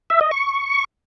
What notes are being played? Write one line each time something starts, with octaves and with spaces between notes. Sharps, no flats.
E5
D#5
C#6